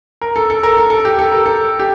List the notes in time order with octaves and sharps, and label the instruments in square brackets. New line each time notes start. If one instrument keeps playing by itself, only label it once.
[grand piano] A#4
A4
A4
A#4
A4
A4
G4
A4
A#4
A4
G4